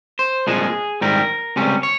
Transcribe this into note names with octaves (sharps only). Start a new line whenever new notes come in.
C5
C2 A#2 F3 G#3 G#4
G#2 D#3 G3 A#4
C#2 C3 G3 C#4
C#5